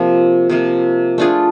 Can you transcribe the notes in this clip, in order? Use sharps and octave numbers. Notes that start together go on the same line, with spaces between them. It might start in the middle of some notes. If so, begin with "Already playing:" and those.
Already playing: C3 F3 A#3
C3 F3 A#3
A3 D4 F4 G#4